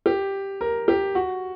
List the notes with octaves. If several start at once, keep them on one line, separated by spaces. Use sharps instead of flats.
G4
A#4
G4
F#4